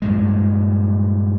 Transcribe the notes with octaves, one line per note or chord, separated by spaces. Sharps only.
G2 A#2 G#3